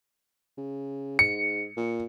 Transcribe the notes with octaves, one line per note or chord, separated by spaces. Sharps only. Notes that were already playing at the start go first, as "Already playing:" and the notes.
C#3
G#2 C#7
A#2